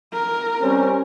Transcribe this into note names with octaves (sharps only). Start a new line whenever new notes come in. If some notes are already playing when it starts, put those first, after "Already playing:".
A#4
G3 C4 C#4